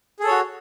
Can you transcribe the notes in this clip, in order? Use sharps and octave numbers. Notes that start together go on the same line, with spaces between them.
F#4 G#4 A4 C#5